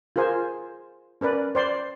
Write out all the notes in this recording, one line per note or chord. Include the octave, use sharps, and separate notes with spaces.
F4 G#4 A#4 C5 G#5
C#4 A#4 B4 D5
C5 D5 C6